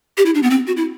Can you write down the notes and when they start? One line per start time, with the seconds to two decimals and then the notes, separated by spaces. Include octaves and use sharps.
0.17 G4
0.26 E4
0.35 D4
0.43 B3
0.50 C4
0.67 F#4
0.77 E4